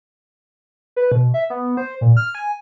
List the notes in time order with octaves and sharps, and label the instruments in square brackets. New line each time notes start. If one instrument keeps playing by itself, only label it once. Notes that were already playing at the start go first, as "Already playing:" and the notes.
[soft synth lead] B4
B2
E5
B3
C5
A#2
F6
G#5